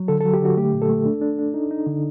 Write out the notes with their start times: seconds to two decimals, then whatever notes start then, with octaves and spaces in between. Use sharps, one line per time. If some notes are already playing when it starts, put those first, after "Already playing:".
Already playing: F#3
0.08 D3 A4
0.21 F#3 A4
0.33 G4
0.41 D3 F#4
0.57 A3 G4
0.74 A#2
0.82 A4
0.89 A3
1.05 D4
1.22 D4
1.39 D4
1.54 D#4
1.71 D#4
1.87 D3